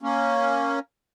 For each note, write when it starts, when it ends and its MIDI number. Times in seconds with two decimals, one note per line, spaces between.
0.02 0.79 58
0.02 0.79 61